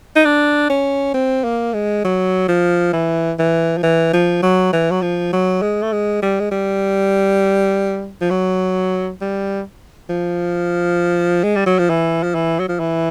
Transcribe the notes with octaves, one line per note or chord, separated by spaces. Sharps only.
D#4
D4
C#4
C4
A#3
G#3
F#3
F3
E3
E3
F3
E3
F3
F#3
E3
F#3
F3
F#3
G#3
A3
G#3
G3
G#3
G3
F3
F#3
G3
F3
G#3
G3
F#3
F3
E3
F3
E3
F#3
F3
E3